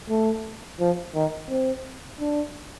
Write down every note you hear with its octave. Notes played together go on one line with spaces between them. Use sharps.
A3
F3
D#3
C4
D4